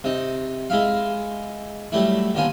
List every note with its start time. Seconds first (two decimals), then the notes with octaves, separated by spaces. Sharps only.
0.04 C3 D#4
0.70 G#3 E4 E5 F5
1.92 F#3 G3 A3 E4
2.35 D#2 D3 B3 F4 G#5